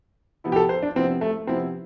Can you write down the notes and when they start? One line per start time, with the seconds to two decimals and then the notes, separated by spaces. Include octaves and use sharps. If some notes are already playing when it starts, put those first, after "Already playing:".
0.44 C3 F3 B3 E4
0.52 G4
0.56 A4
0.69 C5
0.83 D4
0.96 C3 F3 B3 C4 E4
1.21 A3
1.47 C3 F3 B3 C4 E4